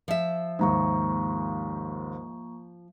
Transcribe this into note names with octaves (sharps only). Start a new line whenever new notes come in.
F3 E5
D#2 G#2 A#3 A#5 C#6